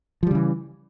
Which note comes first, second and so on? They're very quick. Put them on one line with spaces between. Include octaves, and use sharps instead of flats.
F3 G3 C#3 E3